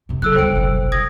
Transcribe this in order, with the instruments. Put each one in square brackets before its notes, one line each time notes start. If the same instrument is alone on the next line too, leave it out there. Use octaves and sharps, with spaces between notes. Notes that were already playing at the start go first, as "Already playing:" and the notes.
[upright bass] F#2 C3
[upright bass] F#3 [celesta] A4 E6 F#6
[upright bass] C#2 G3 [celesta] C5 G5 D7
[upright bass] F#1 B1
[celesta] D#6 G#6 A#6